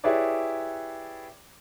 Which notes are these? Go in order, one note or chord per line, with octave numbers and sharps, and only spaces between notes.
E4 G4 G#4 B4 C#5 D5